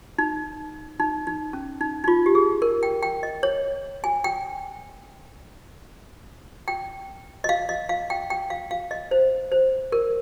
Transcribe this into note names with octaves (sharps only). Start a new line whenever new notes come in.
D#4
D#4
D#4
C#4
D#4
D#4
F4
G4
G#4
A#4
G5
G5
D#5
C#5
G#5
G5
G5
D#5
F5
D#5
F5
G5
G5
F5
F5
D#5
C5
C5
A#4